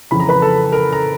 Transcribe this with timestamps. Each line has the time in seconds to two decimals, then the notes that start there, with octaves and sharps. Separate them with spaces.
0.11 F2 C#3 E3 B5
0.20 A#5
0.29 B4 B5
0.42 A4 A5
0.72 A#4 A#5
0.92 A#5